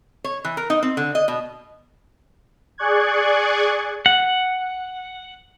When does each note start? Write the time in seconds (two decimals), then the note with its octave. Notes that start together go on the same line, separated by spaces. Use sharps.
0.24 C#5
0.44 E3
0.57 A#4
0.70 D#4
0.83 C4
0.97 D3
1.15 D#5
1.28 B2
2.78 G#4 D5 C#6 F#6 G#6
4.06 F#5